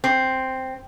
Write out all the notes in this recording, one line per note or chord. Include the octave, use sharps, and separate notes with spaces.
C4